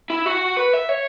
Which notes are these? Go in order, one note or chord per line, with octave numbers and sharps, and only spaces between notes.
E4
F#4
B4
E5
C#5